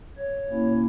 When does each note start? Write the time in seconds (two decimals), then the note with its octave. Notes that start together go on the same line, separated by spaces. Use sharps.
0.18 C#5
0.49 B2 A#3 C#4 E4